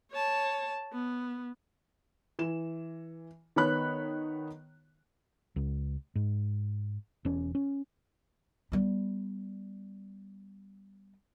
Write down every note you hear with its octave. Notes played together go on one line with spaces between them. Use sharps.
C#5 A5
B3
E3 E7
D#3 B3 C#5 B5 F#6
C#2
G#2
E1 C#4
C#4
G3 B3